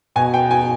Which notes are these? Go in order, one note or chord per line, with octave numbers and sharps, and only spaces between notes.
B2 G#5
G5
G#5